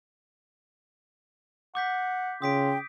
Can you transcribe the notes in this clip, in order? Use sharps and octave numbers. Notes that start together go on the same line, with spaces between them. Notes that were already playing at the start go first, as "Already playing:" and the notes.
F#5 D6 G6 B6
C#3 F4 G5 D#6 B6 D7